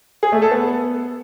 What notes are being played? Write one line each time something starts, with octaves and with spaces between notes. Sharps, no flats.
G#4
A3
A4
B3